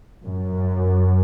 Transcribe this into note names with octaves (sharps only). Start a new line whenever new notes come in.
F#2